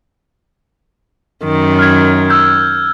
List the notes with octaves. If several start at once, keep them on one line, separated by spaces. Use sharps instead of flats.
F#2 D#3
F6 G#6
E6 G6